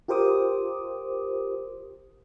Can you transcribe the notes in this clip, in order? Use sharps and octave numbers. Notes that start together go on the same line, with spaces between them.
F4 G4 A#4 C5 D6 D#6